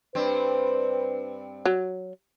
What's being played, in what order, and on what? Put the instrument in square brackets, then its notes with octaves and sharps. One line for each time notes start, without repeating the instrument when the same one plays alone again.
[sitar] G2 C4 [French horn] B4
[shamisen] F#3